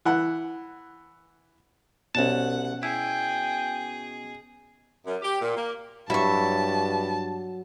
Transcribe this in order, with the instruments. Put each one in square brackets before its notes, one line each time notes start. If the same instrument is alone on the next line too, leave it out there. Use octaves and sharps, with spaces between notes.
[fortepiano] E3 F#5
[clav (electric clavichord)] C2 A5 [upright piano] B2 C#4 [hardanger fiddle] F#5
[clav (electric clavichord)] E4 [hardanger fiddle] G#4 [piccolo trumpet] G5
[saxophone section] F#2
G4
A#2
A#3
[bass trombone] G2 [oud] F#3 E5 [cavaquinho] E4 C#6 [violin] A5